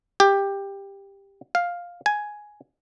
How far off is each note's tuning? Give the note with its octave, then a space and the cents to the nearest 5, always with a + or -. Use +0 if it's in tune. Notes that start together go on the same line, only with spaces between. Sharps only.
G4 +10
F5 +5
G#5 +5